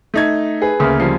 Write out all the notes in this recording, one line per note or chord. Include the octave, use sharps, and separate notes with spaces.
A3 D#4 G#6
G#4 B4
D2 C#3 A#3
F3 G3 C7